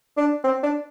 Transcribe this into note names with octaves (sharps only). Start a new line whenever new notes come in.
D4
C4
D4